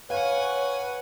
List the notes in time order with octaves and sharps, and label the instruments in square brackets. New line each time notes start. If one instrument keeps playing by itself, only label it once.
[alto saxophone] B4 [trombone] C#5 [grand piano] F5 [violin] F#5 G#5